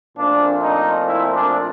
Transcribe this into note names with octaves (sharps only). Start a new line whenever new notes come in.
A#2 F3 A3 C4 D4
D#4
E4
D4